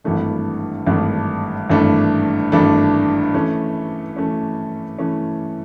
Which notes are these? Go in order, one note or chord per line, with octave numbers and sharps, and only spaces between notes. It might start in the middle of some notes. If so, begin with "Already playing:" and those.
G#1 G2 E3 A3 D4
G#1 G2 E3 A3 D4
G#1 G2 E3 A3 D4
G#1 G2 E3 A3 D4
E3 A3 C#4
E3 A3 C#4
E3 A3 C#4